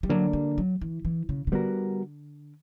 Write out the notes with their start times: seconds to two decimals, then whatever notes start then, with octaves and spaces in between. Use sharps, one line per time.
0.03 G3
0.09 D3 F#3 A#3 D4 A#4
0.33 G3
0.58 F#3
0.81 E3
1.05 E3
1.29 C#3
1.47 C#3
1.52 D3 G3 B3 F#4 A#4